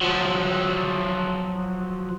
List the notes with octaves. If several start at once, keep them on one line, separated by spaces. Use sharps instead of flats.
F3 F#3